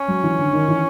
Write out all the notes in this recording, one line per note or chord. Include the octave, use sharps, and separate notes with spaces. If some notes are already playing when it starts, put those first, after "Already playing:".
Already playing: C#4
F#3
E3
D3
D#3
E3